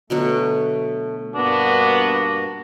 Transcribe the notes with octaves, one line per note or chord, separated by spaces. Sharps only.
B2 D3 F#3 A3
G2 A#3 B3 D4 F#4